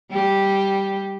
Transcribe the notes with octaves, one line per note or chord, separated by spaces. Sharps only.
G3 G4